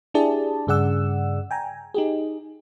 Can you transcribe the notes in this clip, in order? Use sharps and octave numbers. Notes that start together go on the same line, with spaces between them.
D4 E4 G4 G#4 D5 A5
G2 C#3 G#4 D5 F#5 E6
G5 G#5 A#5
D#4 G4 G#4